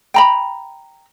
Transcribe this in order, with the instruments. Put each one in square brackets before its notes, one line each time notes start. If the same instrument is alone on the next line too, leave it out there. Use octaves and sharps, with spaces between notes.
[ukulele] G5 A#5 B5